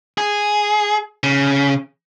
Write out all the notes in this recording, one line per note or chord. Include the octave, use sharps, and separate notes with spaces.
G#4
C#3